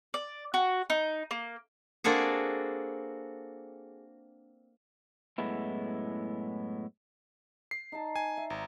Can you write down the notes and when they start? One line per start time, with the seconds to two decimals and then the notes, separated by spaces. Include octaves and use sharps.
0.14 D5
0.54 F#4
0.90 D#4
1.31 A#3
2.04 A#3 C4 D4 F#4 G#4 A4
5.38 F#2 A2 G#3 B3 E4
7.71 C7
7.92 D#4 D#5 A5
8.16 G#5
8.37 E5
8.50 G#1 A#5